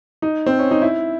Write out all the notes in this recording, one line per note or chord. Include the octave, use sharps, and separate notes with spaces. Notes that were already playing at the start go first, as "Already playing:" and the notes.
D#4
C4
C#4
D#4
E4